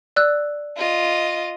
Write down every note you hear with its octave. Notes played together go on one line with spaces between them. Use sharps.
D5 E6 F#6
F4 D#5